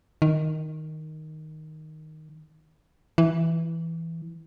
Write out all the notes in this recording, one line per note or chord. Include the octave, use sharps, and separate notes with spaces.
D#3
E3